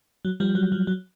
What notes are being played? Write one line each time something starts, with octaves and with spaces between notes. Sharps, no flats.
F#3
F3 G3
F#3
F3
F#3